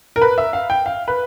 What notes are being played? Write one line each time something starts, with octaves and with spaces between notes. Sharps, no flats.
A#4
B4
E5
F5
G5
F5
B4